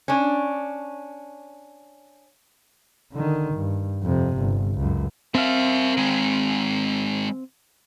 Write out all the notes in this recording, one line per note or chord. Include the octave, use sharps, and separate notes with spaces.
C#4 D4
D3 D#3
G2
F2 C3
G1
C#2 F#2
C4 A#4 E5 F5
D#3 G#3